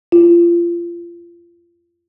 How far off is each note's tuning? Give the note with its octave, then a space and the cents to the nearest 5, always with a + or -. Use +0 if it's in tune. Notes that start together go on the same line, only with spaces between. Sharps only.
F4 -30